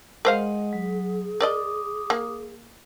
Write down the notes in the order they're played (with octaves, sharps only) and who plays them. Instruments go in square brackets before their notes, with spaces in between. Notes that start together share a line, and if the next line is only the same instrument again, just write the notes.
[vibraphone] G#3 D#5 F#5 [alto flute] G#4 [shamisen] A#4 C5 F5
[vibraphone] F#3
[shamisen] A#4 D5 D#5 [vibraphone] D6 D#6
[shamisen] A#3